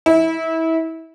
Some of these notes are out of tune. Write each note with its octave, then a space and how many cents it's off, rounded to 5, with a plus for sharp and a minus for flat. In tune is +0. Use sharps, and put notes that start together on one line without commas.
E4 -25